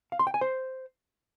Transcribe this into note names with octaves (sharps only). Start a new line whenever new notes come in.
F5
C6
G5
G#5
C5